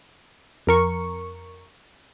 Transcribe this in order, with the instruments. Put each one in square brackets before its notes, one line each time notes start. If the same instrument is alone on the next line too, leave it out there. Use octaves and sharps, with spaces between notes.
[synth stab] F2 A#4 C#6